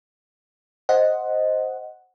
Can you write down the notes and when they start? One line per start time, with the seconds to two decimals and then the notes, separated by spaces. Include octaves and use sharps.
0.89 C5 D#5 F#5